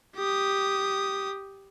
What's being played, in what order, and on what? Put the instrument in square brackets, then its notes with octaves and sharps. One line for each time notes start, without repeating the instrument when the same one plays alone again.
[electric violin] G4 D#6